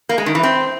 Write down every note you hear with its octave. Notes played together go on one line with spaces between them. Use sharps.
A#3
G#3
D#3
E3
C4